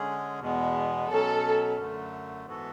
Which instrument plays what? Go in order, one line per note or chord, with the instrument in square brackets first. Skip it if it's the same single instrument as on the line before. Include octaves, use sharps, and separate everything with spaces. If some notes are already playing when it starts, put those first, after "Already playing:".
Already playing: [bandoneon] D3 G#3 C#4 G#4
E2 B2 G#3 B3
[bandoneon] B2 F#3 C#4 [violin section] A4
[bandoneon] F#2 D3 A3
G#2 E3 B3 F#4 A4